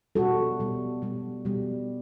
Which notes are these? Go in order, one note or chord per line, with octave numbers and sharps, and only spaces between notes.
B2 G3 F#4 A4
B2 G3
B2 G3
B2 G3